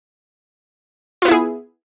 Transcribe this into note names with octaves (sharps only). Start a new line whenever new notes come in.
B3 E4 F4 G#4